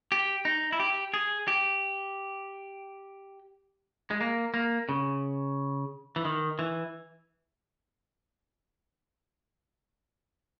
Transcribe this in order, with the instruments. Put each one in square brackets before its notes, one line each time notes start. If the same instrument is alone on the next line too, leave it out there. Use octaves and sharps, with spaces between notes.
[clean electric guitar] G4
D#4
E4
G4
G#4
G4
G#3
A#3
A#3
C#3
E3
D#3
E3